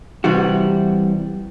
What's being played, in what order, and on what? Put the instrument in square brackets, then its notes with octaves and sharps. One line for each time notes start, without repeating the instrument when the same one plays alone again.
[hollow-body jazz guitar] C3 E3 G3 F#4